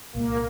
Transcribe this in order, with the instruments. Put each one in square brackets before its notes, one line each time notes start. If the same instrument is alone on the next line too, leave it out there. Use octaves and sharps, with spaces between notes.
[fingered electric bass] C2 A#2 G#3 [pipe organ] A#3